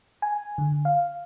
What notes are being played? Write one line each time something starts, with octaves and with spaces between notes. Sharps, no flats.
G#5
D3
F5